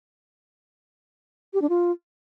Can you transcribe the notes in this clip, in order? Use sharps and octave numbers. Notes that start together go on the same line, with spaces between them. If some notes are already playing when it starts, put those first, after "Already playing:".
G4
D4
F4